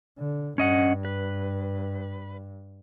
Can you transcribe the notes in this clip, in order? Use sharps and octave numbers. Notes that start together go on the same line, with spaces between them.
D3
G2 C#4 D#5 F#5
B4